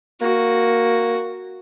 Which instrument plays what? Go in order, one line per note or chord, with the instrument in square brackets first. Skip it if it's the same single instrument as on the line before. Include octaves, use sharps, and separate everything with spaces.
[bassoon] A#3 [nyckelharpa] F#4